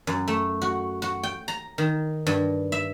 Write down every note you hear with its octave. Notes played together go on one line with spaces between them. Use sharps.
F#2
A3
F#4
F#4
G5
A#5
D#3
G2
E5